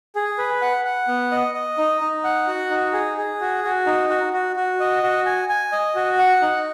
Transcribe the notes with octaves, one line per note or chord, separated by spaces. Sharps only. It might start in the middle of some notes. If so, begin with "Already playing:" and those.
G#4
B4
F#5
F#5
B3
D#5
D#5
D#4
D#4
F#5
F#4
D#4
G#4
G#4
F#4
F#4
D#4
F#4
F#4
F#4
D#5
F#4
G#5
G#5
D#5
F#4
F#5
D#4